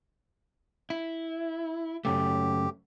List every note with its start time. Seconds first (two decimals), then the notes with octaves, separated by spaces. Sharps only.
0.90 E4
2.05 F#2 C#3 A3 G4